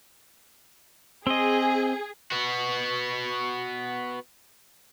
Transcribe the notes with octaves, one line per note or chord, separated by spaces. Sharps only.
C4 G#4 D#5
B3 F#4